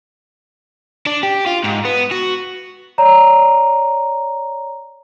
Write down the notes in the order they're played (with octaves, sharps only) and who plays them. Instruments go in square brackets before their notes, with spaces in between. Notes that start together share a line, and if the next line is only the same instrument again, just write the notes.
[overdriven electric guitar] D4
G4
F4
G#2
B3
F#4
[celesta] C#5 D5 A#5